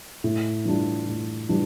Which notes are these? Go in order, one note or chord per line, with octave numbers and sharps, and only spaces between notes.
A2
E3 G3 D4 F4
A2
E3 G3 D4 F4